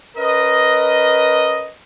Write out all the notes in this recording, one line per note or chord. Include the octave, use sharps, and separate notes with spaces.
C#4 A#4 B4 D#5